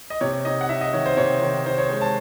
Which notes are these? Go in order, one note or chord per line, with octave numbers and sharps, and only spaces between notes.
D#5
C3 C#5
D#4 D#5
F#5
D#4 E5
D#5
D#3 C#5
C5
C3 C#5
D#3
D#4 C5
C#5
G#3 C5
A5